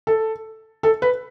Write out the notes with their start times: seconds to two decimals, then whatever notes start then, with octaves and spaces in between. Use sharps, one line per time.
0.07 A4
0.83 A4
1.02 B4